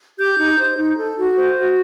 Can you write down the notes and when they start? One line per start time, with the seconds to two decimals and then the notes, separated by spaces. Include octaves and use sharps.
0.18 G4 G6
0.37 D#4
0.58 C5
0.77 D#4
0.97 A4
1.18 F#4
1.37 C5
1.57 F#4